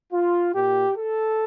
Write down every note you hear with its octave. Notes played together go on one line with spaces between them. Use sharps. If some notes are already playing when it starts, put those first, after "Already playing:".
F4
A#2 G4
A4